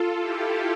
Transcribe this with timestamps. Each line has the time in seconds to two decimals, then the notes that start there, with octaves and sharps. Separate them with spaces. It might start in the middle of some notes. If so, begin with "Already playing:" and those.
Already playing: F4 A4
0.19 E4 G4